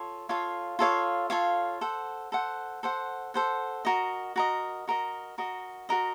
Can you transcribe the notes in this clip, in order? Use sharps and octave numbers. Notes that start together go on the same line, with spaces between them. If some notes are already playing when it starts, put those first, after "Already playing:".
Already playing: F4 A4 C#5
F4 A4 C#5 F5
F4 A4 C#5 F5
F4 A4 C#5 F5
A4 C5 F#5
A4 C5 F#5
A4 C5 F#5
A4 C5 F#5
F#4 A#4 D#5
F#4 A#4 D#5
F#4 A#4 D#5
F#4 A#4 D#5
F#4 A#4 D#5